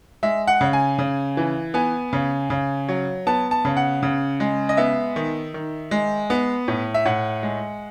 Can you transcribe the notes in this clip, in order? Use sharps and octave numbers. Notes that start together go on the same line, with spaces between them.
G#3 E5
F#5
C#3
G#5
C#3
E3
B3 G#5
C#3
C#3
F#3
B3 A5
A5
C#3
F#5
C#3
G#3
D#5
B3 E5
D#3
D#3
G#3
B3
A2
E5
A2 F#5
G#3